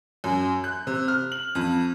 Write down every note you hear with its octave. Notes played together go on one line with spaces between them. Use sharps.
F#2
F#6
C3
F6
F#7
F2